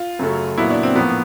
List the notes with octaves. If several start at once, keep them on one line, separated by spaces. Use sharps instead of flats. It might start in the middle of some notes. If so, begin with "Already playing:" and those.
Already playing: F4
F#2 C#3 F#3 A3
A#2 F#3 B3 E4
D4
C4
A2 F3 A#3 B3